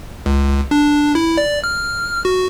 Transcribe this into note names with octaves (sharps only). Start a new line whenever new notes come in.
C#2
D4
E4
D5
F6
F#4